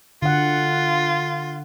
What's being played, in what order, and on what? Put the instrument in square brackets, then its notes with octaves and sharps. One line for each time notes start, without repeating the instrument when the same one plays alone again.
[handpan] D3 F#5 [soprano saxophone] F4